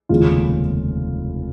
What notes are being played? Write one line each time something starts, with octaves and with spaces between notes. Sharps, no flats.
F1 D#2 C#3 G#3 F4